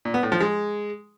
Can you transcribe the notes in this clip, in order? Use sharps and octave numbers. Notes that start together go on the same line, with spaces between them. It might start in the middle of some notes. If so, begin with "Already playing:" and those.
A#2
B3
A2
F3
G#3